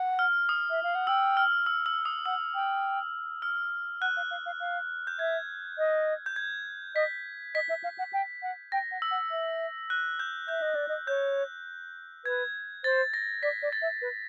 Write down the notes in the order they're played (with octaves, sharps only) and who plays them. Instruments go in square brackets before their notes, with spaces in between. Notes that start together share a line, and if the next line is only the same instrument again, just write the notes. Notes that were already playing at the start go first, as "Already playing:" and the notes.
Already playing: [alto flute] F#5
[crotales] F6
D#6
[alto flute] E5
F5
F#5
[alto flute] G5 [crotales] E6
[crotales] F6
E6
E6
D#6
[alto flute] F#5 [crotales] E6
[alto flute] G5
[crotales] F6
[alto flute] F#5 [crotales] F#6
[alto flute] F5
F5
F5
F5
[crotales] G6
[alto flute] E5 [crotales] G#6
[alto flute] D#5
[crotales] G6
G#6
[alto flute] D#5 [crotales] B6
[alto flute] D#5 [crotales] B6
[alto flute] E5
F5
F#5
G5
F#5
[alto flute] G5 [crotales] A#6
[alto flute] F#5
[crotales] E6
[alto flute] F#5
E5
[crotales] F#6
G6
[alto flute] E5 [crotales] G6
[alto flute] D#5
D5
D#5
[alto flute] C#5 [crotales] G6
[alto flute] B4 [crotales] G#6
[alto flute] C5 [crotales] A6
[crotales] A#6
[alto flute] D5 [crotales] B6
[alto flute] D5
[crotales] A6
[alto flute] E5
B4